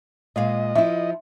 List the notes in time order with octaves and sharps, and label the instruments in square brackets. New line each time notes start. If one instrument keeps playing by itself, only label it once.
[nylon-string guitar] A#2 G#3 F5 [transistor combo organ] D#5
[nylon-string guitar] F3 E4 [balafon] E5